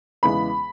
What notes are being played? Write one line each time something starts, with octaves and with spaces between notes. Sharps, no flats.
E2 C#3 E3 G#3 B3 B5